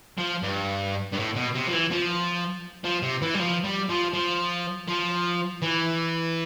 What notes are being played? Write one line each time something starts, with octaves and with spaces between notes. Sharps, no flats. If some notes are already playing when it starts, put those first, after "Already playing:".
F3
G2
G2
A2
B2
C3
F3
E3
F3
F3
C3
E3
G3
F3
G3
F3
F3
F3
E3